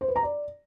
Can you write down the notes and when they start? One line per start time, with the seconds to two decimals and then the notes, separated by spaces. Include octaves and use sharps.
0.01 C5
0.08 B4
0.16 A#5
0.23 D5